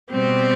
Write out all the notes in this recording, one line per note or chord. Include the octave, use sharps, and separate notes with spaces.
B2 G3 C4 G4